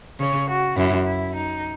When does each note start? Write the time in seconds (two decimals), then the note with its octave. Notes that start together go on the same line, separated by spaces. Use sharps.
0.19 C#3 C#5
0.49 F#4
0.77 F#2 E4
1.06 E4
1.34 D#4